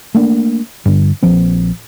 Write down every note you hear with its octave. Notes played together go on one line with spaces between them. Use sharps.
A3 A#3 D4
G2 D3
A#1 F3 C4